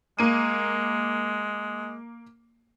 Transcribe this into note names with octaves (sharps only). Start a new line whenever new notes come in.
G#3 A#3 D#7